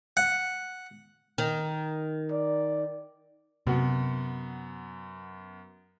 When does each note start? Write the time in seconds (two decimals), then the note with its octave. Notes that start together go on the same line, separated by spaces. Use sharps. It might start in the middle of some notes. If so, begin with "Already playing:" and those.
0.17 F#5
1.38 D#3
2.32 D5
3.67 F#2 C3 B3 F#4